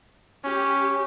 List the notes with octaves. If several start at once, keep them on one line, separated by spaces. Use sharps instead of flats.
C#4 G4